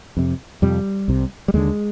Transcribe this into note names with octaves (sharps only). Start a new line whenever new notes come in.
F2 C3
F2 C3 G3
C2 C3
G3
D#2 D3 G#3